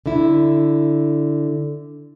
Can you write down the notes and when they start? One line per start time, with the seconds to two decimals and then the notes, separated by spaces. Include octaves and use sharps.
0.06 D3 E4